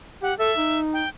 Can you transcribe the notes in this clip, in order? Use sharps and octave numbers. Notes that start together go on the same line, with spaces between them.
G4 F#5
A4 E5
D#4
G5